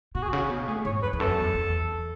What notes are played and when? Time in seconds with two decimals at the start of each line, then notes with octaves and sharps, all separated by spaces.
0.15 B2 F#4
0.23 G#4
0.30 C#3 F#4
0.50 B2
0.68 A2 G#4
0.85 G#2 C#5
1.02 E2 B4
1.13 E2
1.20 F#2 A4
1.38 E2
1.55 E2